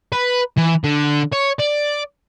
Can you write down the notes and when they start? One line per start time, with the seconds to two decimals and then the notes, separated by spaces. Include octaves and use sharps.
0.13 B4
0.57 E3
0.84 D3
1.32 C#5
1.59 D5